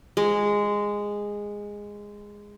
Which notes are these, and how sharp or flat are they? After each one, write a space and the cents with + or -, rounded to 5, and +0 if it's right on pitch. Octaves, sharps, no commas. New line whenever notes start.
G#3 -10